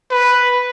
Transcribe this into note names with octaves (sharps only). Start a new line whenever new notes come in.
B4